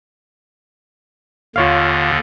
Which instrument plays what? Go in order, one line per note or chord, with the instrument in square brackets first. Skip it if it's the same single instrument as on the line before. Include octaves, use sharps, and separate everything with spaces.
[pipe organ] D#2 D3 [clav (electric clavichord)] F4 C#5 F5